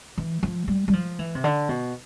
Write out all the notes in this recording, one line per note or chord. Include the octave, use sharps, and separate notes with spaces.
E3
F3
G3
G3
F3
E3
C3
D3
B2